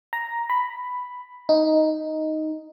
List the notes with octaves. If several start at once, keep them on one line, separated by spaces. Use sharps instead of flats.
A#5
B5
D#4